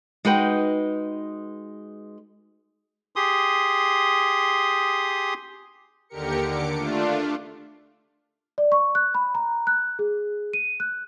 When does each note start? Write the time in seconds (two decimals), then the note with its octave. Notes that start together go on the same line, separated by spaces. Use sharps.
0.25 G#3 D#4 F#4 B4 G5
3.16 G4 G#4 C6 D#6
6.09 D#2 D3 G4 A#4 C#7
6.44 D3 D6 C#7
6.76 A3 D4 F4
8.58 D5
8.72 C#6
8.95 F#6
9.15 B5
9.35 A#5
9.67 F#6
9.99 G#4
10.53 D#7
10.80 F#6